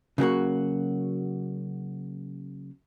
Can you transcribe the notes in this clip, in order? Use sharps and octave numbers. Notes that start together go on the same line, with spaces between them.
C#3 F#3 A#3 F#4